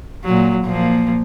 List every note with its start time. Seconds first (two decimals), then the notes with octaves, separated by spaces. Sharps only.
0.24 A#2 F#3
0.64 A#2 F3 A#3